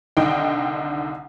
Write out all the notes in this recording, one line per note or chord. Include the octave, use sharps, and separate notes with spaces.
C2 D3 D#3 D#4 G5